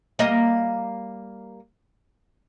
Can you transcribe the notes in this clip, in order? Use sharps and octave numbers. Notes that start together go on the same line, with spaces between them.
G3 A#3 D#5